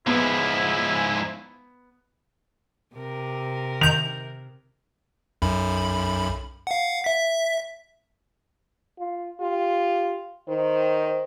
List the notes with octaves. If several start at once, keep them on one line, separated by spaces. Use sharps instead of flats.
G#2 F3 B3 E4
C3 A#4
D#3 G6 F7
B1 F#2 B5
F5 F#5
E5 B6
F4
F4 G4
D#3 C5